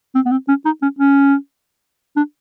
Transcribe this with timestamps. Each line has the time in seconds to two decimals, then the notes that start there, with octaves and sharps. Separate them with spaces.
0.15 C4
0.26 B3
0.31 C4
0.48 C#4
0.65 D#4
0.82 C#4
0.99 C#4
2.17 D4